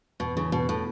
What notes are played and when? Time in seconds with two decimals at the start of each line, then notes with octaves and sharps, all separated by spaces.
0.20 E2 B2
0.36 C#3 E3
0.52 E2 B2
0.69 A2 B3